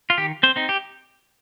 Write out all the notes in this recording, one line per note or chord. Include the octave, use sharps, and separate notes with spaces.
F4
D#3 G4
C4 C5
C4 D#4
G4